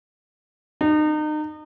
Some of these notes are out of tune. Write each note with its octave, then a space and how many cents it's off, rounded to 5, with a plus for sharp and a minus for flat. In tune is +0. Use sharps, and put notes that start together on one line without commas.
D#4 -35